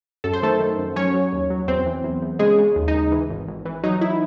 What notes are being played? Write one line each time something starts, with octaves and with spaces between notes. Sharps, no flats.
F#2 A4
C5
D#3 A3 A4
D#3
F#2
F#3 C#4 C#5
F#3
D#2
F#3
E2 C4 C5
E3
E2
E2
C#3 G#3 G#4
C#3
D#2
D#4
D#2
E3
G#1
G#1
E3
F#3 D#4
E4